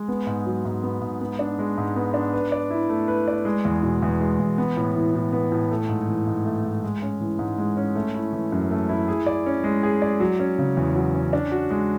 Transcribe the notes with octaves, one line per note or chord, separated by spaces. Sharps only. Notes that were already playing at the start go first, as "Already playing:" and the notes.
Already playing: G#3
B3
G#2
F#3
G#2
B3
G#2
B3
D4
G#3
G#2
B3
D4
B4
D5
E4
A3
B4
D5
G#3
E2
B2
E2
G#3
E2
B3
A2
E3
A2
B3
A2
A3
G#2
E3
G#2
A3
G#2
G#3
C#4
E3
G#2
G#3
C#4
A3
E4
E3
F#2
A3
E4
G#4
D5
C#4
G#3
G#4
D5
F#3
C#4
C#3
E2
F#3
C#4
D4
F#4
G#3